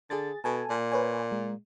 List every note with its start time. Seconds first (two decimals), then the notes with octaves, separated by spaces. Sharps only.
0.10 D3 G#4 A6
0.44 B2 A4 G#5 A5
0.70 A#2
0.91 B4 C#5 G#5
1.32 G#3